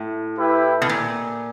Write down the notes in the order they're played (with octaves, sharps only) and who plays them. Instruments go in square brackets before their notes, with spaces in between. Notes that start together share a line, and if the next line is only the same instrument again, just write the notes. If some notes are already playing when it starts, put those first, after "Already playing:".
Already playing: [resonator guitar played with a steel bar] A2
[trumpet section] E4 G4 B4 E5 G5
[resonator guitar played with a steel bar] B2
A#2